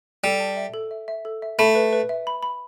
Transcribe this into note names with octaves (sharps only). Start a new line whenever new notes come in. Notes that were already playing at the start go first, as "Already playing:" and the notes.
G3 A4
A5
E5
A4
E5
E5
A4
E5
A3 B5
B4
B4
E5
B5
B5